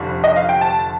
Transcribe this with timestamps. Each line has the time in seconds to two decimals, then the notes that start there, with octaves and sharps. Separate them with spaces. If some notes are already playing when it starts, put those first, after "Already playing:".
Already playing: F1 F2 D3 G3
0.24 D#5
0.36 F5
0.49 G5
0.61 A5